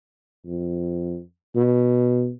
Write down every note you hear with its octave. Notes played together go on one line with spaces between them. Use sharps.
F2
B2